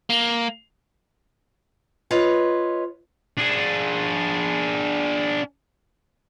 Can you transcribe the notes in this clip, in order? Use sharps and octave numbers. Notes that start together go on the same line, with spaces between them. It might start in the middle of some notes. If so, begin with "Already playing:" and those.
A#3
F4 B4 C#5 D#5
D4 G#4